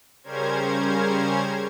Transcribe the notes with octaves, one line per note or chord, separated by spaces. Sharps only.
C#3 G3 C#4 A#4 C5 G#6